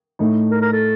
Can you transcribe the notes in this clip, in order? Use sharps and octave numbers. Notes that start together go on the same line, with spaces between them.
A2 A3 D#4
A#4
A#4
A4